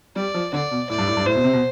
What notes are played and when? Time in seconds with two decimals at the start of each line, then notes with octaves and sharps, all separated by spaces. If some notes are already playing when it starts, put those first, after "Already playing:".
0.16 G3 D5
0.34 F3
0.53 D3 D5
0.71 B2
0.89 A2 D5
0.98 G2
1.08 A2
1.17 G2
1.26 A2 C5
1.35 B2
1.44 C3
1.53 B2